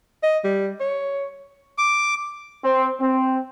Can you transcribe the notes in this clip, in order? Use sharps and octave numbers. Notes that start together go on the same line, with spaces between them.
D#5
G3
C#5
D6
C4
C4